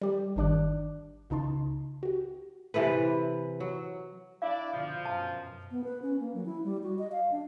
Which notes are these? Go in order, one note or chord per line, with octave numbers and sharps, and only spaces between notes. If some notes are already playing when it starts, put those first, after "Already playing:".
G3 G4
G1 D#3 D4 D5 D6 F#6
C#2 C#3 D#4 A5 C6
F#4 G4
C3 E3 A4 B4
F#3
D4 E4 D5 F5
B2 D3 F3
F#2 B2 A5
B3
B4
C#4
A#3
F#3
E4
G3
F#4
D#5
F5
D4